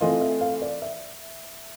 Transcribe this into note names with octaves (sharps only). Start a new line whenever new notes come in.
E3 A3 C4 F4 D#5
E5
F5
D5
E5